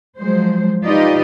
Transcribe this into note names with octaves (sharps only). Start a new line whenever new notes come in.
F3 F#3 G#3 C5
D#4 F4 G4 B4 D5 D#5